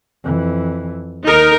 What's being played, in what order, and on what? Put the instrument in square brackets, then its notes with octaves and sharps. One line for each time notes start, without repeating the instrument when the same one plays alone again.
[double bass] F2 E3
[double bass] D#2 [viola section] D#4 A#4